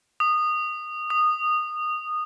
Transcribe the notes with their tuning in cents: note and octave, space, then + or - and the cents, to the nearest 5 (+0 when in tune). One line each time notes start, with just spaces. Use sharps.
D#6 -20
D#6 -15